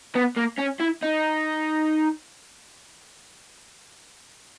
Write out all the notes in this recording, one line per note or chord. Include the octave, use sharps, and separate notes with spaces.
B3
A#3
C#4
E4
D#4